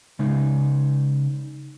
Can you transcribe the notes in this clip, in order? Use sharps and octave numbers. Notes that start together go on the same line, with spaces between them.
C#3 G#3 D#4